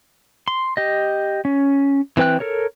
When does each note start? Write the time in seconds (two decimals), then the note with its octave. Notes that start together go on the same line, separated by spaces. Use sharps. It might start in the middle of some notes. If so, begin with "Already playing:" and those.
0.48 C6
0.77 G4 D#5
1.45 C#4
2.17 E3 C4 B4 G5 F#6
2.40 A4 A#4 C#5